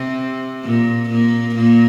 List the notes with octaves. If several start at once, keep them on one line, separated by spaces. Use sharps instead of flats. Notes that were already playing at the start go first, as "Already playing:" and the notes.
Already playing: C3 C4
A#2 A#3
A#2 A#3
A#2 A#3